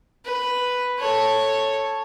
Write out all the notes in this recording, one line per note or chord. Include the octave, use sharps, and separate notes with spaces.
B4
A4 C#5